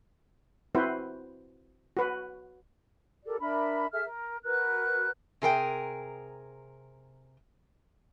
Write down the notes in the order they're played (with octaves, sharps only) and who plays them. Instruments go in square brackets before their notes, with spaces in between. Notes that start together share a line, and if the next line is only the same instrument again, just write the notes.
[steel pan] C4 E4 F#4 B4 C5
F#4 B4
[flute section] G4 A4 A#4 D5
D4 A#4 E5 B5
G#4 A4 E5 F6
A#4
F#4 A#4 B4 F#6
[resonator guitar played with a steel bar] C3 G#4 A#4 G5